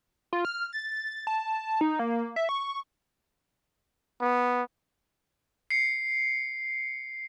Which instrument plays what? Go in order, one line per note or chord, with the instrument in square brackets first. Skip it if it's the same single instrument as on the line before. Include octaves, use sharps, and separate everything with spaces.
[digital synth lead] F4
F6
A6
A5
D#4
A#3
E5
C#6
[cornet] B3
[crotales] C7 C#7